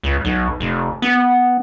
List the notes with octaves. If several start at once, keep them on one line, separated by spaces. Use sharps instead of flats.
C#2
B1
F1
B3